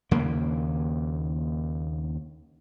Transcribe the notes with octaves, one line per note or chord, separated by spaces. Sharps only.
D#2 C#3 A#3